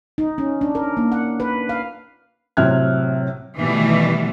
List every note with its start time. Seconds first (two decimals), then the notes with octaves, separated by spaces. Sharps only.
0.18 D#4
0.38 C#4
0.61 D4
0.75 A#4
0.97 A#3
1.12 F#5
1.40 B4
1.69 F5
2.57 A2 C3 F#3 F6 F#6 G#6
3.58 B2 D#3 E3 G3 A3 B3